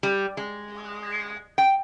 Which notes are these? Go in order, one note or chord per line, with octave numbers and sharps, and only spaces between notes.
G3
G#3
G5